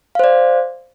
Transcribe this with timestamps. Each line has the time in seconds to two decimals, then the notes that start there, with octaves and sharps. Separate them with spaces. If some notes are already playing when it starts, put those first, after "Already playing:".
0.15 F5
0.19 C5
0.24 D5